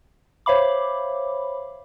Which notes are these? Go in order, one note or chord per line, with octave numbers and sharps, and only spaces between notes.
C5 C#5 E5 F5 B5 D6